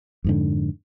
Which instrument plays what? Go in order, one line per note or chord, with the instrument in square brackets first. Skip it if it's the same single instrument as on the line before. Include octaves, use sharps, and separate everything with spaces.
[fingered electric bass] F2 G#2 D3